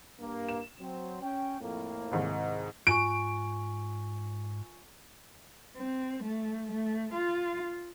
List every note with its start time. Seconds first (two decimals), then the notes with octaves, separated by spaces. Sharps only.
0.19 G2 A#3
0.49 E7
0.80 F#3 C4
1.22 C#4 G5
1.61 F2 A2 A#3
2.11 C2 G#2 D#3
2.87 G#2 F4 G#5 C#6 D7
5.76 C4
6.23 A3
6.71 A3
7.12 F4